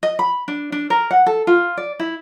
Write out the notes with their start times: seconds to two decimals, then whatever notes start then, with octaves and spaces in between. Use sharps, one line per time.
0.03 D#5
0.19 B5
0.48 D4
0.72 D4
0.90 A#4
1.11 F#5
1.26 A4
1.47 F4
1.77 D5
2.00 E4